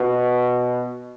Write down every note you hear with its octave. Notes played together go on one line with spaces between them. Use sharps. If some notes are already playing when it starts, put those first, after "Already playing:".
Already playing: B2